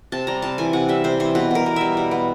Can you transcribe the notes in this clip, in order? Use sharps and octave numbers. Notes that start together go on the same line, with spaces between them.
C3 A5
G3 A#5
C3 A5
E3 G#5
C3 F#5
G3 E5
C3 C5
E3 C5
B2 B4
B3 A#4
B2
G3 E5
B2
B3